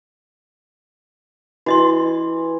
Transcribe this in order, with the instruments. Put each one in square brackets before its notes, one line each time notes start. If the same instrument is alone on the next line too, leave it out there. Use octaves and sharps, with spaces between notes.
[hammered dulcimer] E3 [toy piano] F#4 D#5 C6